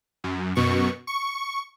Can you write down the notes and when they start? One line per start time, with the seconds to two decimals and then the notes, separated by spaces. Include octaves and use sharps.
0.24 F#2
0.55 F#2 B2 C#6
1.07 C#6